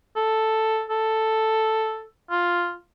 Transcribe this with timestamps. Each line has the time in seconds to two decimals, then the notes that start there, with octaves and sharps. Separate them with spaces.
0.16 A4
0.90 A4
2.30 F4